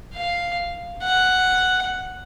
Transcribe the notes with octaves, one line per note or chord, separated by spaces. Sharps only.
F5
F#5